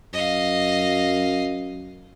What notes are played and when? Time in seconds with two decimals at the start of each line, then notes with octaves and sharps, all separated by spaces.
0.13 F#2 D#5 F5